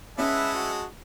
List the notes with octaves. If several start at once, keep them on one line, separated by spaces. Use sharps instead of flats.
G#3 C#4 E4 B4 D#5 E5 F#5 A5
F#4